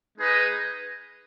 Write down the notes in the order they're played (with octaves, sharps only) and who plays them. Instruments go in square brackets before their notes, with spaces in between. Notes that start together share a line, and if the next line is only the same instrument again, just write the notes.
[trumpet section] G#3 D#4 G#4 B4 D#5